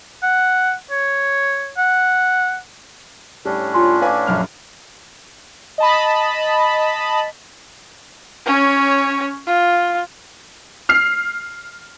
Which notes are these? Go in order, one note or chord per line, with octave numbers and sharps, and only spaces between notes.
F#5
C#5
F#5
A2 G3 C#4 D4
F4 G#5 C6
B4 D5 F5 G#5 D6
A#1 F#2 F6
D#5 A5 B5
C#4 C#5
F4
F6 C7